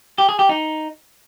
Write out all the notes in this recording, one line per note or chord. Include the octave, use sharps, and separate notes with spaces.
G4
G#4
G4
D#4